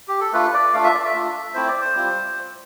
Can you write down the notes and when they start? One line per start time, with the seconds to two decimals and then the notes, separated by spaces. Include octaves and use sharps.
0.08 G4
0.20 A4
0.33 A3 D4 F4 B4
0.54 D5
0.73 A3 D4 F4 F5
0.83 E5
0.94 D5
1.04 E5
1.14 A3 D4 F4
1.54 A3 C4 E4 C5
1.68 D5
1.81 C5
1.95 G3 C4 F4